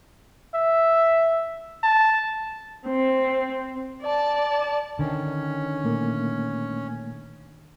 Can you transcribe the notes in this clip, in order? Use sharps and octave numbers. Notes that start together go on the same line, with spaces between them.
E5
A5
C4
D5 A5
D3 D#3 C#4
A#2 A3 A#3